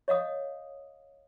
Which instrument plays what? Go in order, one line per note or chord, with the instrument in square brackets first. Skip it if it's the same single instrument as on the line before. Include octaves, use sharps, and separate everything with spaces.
[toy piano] C#5 D#5 F5 D#6